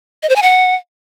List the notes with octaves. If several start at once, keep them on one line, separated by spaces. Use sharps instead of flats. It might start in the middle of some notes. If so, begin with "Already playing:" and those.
D#5
C5
G#5
F#5